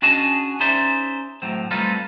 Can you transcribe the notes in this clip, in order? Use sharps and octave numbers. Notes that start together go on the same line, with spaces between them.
C#4 D4 F#4 G#4 D#5 A5
C#4 D#4 G#4 C5 D5 E5
A2 F#3 C4
G3 A3 C4 D#4 F4 B4